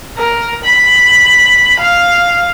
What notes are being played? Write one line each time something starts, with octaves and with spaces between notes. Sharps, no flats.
A#4
B5
F5